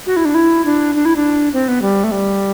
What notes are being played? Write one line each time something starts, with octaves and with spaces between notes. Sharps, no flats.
F#4
E4
D4
E4
D4
D4
E4
D4
C4
B3
G3
A3
G3